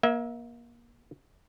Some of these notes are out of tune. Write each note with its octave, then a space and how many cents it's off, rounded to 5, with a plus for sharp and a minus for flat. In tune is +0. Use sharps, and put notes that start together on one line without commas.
A#3 +25 E5 -20